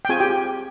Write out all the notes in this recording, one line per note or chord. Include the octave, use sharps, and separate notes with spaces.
G5
C4 F4 G#4 G#5
G4 G5